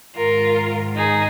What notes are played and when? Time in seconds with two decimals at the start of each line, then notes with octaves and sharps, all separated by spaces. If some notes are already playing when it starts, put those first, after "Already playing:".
0.15 G#2 D#3 F4 A#4
0.96 D#4 G#4